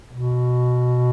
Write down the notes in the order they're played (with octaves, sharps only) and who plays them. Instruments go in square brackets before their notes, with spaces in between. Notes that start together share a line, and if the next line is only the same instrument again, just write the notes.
[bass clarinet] B2